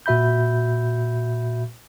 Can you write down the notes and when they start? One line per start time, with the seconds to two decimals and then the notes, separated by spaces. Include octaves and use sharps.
0.06 A#2 F#4 E5 B5 G6